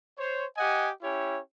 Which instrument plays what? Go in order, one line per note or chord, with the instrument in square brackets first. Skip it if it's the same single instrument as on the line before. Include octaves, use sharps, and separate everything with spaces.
[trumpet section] C5 C#5
G4 D#5 F#5 G#5
C#4 E4 G4 C#5